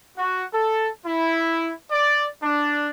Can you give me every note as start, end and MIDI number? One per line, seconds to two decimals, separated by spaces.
0.17 0.45 66
0.53 0.89 69
1.06 1.71 64
1.91 2.25 74
2.43 2.89 62